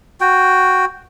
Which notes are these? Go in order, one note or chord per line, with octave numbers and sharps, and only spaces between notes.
F#4 G5